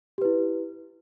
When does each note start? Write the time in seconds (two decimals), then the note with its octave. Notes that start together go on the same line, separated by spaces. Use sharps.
0.18 G4
0.22 B4
0.25 E4